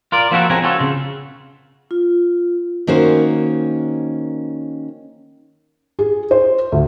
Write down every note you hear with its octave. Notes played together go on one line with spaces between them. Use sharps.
F4 A#4 D5
F3 A#3 C4 E4 F#4 A4
F2 C#3 C4 G#5 A#5
C4 C#4 F4 F#4 A4
C#3
F4
D#3 A#3 C#4 F#4 A#4 C5
G#4
C5
D2